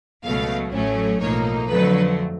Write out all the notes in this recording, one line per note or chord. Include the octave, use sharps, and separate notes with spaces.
C#2 B2 F#3 A3 F5
A1 A2 F#3 A3 C#4
B1 A2 F3 A#3 D#4 C#5
F2 D3 F#3 A3 B4